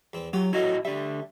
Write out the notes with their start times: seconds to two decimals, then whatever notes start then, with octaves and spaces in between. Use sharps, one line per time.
0.13 E2 C4
0.33 F#3 F4 G4
0.53 A2 F#3 D#4 E4 F#4 D#5
0.85 D3 G3 E5